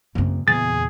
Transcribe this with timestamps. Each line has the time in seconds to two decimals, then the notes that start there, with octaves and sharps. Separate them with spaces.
0.15 F#2 C#3 A#3 C4
0.48 E2 A#2 C#3 G#3 G#4 A6